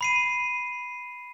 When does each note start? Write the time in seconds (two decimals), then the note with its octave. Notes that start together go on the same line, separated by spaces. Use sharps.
0.01 B5 C7 D#7